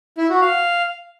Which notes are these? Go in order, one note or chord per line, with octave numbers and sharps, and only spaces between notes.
E4
F#4
F5